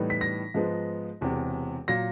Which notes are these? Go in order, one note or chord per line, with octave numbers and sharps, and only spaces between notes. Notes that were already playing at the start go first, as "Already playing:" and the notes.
Already playing: A2 E3 G3 B3 D#4
B6
A#6
G#2 F3 G#3 B3
E1 E2 C3
A#2 F#3 A#6